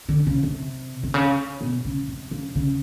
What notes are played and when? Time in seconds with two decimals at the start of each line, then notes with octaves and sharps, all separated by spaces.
0.09 D3
0.27 C#3
0.43 C3
1.03 C3
1.14 C#3
1.61 B2
1.85 C#3
2.08 C3
2.31 C#3
2.55 C#3